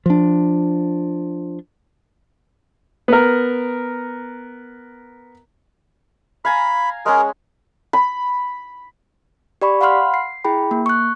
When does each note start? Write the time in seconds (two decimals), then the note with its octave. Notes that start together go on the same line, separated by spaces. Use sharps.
0.06 F3 D4
3.08 B3 A#4
6.45 F5 G#5 A#5 B5
7.06 G#3 C#4 G#4 A#4
7.93 B5
9.62 G4 D5 B5 C#6
9.81 F5 F#5 B5 C6 F6
10.14 C7
10.45 E4 G#4 G5 B5
10.71 A#3
10.86 C#6 F#6